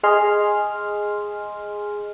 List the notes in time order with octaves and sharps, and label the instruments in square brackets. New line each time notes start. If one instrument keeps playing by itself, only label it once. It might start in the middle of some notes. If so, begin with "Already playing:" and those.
[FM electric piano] G#4 D#5 G#5 C6 F6